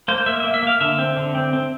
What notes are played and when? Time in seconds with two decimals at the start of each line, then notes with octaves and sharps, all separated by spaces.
0.08 A#3 C5
0.26 A#3 E5
0.40 A#3 E5
0.54 E5
0.63 A#3 F5
0.81 D3 E5
0.99 C4
1.17 D3
1.35 C4
1.53 C4